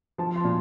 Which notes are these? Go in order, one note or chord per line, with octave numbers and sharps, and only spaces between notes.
F3 A5
C6
A#2